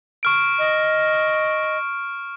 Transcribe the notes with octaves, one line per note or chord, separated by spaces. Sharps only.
C#6 F6 D7
D#5